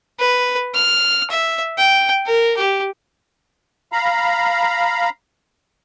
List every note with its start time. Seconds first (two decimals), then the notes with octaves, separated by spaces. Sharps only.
0.19 B4
0.74 F6
1.30 E5
1.78 G5
2.26 A#4
2.57 G4
3.92 F5 A#5 B5